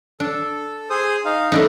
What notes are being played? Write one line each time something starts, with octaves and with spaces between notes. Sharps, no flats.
D4 A4
G#4 C5 D#6
D#4 F5
A3 D4 D#4 B5